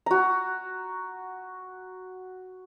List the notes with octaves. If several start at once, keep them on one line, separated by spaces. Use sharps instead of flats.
F#4 A#5